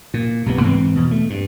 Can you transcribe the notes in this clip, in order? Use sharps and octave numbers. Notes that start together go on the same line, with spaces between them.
A#2
B1 C3 E3 B3
G#2 E3 C4
E2 B2
A3
G2